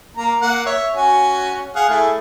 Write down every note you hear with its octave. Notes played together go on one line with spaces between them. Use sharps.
A#3 A#5
A#3 F#5
C#5 E5
C#4 F#4 G#5
G#4 F5 F#5
A3 E4 G#4